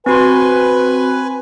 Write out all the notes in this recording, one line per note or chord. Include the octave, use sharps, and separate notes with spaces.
C4 F#4 B4 G#5 C6